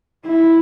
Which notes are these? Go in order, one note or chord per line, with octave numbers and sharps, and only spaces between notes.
E4